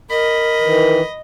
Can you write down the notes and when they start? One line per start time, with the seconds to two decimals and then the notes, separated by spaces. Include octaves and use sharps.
0.10 A#4 D#5 B5
0.61 D#3 E3